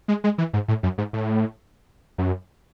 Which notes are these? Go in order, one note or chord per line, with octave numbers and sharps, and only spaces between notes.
G#3
G#3
E3
G#2
A2
F#2
G#2
A2
F#2